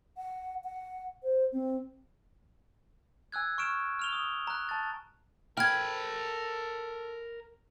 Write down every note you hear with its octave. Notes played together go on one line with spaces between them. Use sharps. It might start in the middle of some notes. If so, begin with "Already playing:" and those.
F#5
F#5
C5
C4
G#5 E6 F#6 G#6
C#6 F6 D7 E7
F6 F7 G7
D#6
A#5 F#6
A5 A6
A4 A#4 G5 B5 F6 G#6